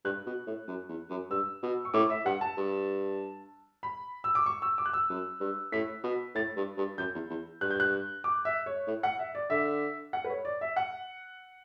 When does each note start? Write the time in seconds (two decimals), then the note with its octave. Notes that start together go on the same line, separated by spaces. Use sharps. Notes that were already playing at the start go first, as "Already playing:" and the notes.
0.05 G2 F#6
0.26 B2
0.47 A2
0.68 F#2
0.89 E2
1.10 F#2
1.30 G2 E6
1.63 B2
1.85 C#6
1.94 A2 D6
2.10 E5
2.25 G2 F#5
2.41 A5
2.57 G2
3.83 B5
4.24 E6
4.35 D6
4.46 C#6
4.62 E6
4.78 D6
4.86 F#6
4.93 E6
5.09 F#2
5.40 G2
5.72 A2 B6
6.04 B2
6.35 A2 A6
6.56 G2
6.77 G2
6.98 F#2 G6
7.14 E2
7.30 E2
7.61 G2 F#6
7.70 G6
7.80 F#6
8.24 D6
8.45 E5
8.66 C#5
8.87 A2
9.03 F#5
9.19 E5
9.35 D5
9.50 D3 E5
10.13 F#5
10.24 B4
10.29 C#5
10.45 D5
10.61 E5
10.76 F#5